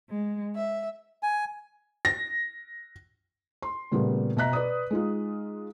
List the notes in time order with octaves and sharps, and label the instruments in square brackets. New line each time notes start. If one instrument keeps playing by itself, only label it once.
[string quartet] G#3
E5
[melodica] G#5
[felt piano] A#6
C6
A#2 C#3 G3 A3 B3
B2 E5 A#5 F#6 B6
B4 D5 D#6
G#3 D#4 F4